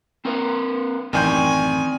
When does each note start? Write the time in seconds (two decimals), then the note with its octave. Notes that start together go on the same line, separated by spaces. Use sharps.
0.25 C4 A#4 B4
1.13 A1 F#2 D#3 C4 D5 G5 G#5 G6